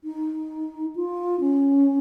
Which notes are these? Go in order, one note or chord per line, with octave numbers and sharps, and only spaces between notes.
D#4
F4
C#4